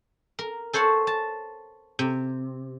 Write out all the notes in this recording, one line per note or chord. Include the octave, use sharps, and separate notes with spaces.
A#4
A4 C5 C#5 F#5 A5
A5
C3